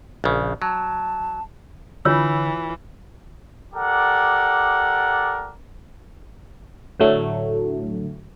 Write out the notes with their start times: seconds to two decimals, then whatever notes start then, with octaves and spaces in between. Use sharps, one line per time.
0.24 A#1 C#3
0.62 F#3 A5
2.05 D3 E3 F4 C#5 E6
3.74 G4 A4 A#4 D5 F#5
7.00 A2 D3 F#3 A3